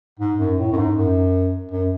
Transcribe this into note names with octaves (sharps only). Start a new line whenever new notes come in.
G#2
F#2
A2
F#2
G#2
F#2
F#2